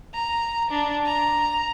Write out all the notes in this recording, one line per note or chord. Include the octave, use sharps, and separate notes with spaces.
A#5
D4
A#5